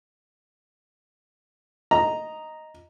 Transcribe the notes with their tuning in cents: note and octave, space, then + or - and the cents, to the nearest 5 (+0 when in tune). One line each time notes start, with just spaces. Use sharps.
D#5 +0 A#5 +0